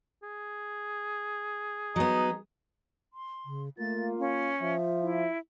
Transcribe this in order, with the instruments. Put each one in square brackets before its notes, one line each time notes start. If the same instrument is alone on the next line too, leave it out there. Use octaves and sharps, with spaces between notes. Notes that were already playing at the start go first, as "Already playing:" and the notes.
[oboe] G#4
[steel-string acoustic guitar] F#3 B3 [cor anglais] D#4
[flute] C6
[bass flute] C#3
[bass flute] A3 [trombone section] A#3 F4 [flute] A6
[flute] C#4 [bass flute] F5
[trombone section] F3 [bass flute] E5
[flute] E4